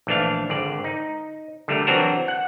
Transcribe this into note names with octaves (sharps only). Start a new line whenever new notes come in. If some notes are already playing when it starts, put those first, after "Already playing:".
A#1 E3 A3 D4 F5
G#1 D3 D5
D#4
D3 G3 A3 A#4
E3 F#3 C4 D4 F#4 A#4
F#5